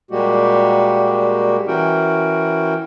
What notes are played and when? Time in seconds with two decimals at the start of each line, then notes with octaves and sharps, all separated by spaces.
0.11 A#2 G3 G#3 A#3 F#4 G4
1.67 E3 C#4 E4 F#4 A#4 G5